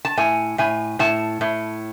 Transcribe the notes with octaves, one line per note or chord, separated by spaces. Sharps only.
A5
A2 G#5
A2 G#5
A2 A5
A2